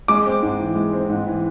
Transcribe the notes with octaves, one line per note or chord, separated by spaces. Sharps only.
G#3 D6
C4
G#2
E3
G#3
C4
G#2
E3